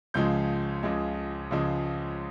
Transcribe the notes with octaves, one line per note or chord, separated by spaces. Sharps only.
C#2 C#3 F3 G#3 G6
C#2 C#3 F3 G#3
C#2 C#3 F3 G#3